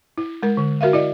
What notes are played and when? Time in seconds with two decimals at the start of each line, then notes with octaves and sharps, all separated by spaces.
0.18 E4
0.43 G#3 A#4
0.57 D3
0.81 F#4 A#4 E5 F5
0.93 E4 D5 D#5